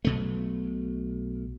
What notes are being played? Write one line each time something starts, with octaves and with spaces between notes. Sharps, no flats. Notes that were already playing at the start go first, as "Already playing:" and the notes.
B1 B2 A3